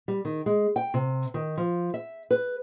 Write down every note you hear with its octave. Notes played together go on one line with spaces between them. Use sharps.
G3
D#3
G#3
G5
C3
D#3
F3
E5
B4